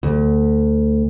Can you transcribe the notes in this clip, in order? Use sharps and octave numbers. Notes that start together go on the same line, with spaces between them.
D2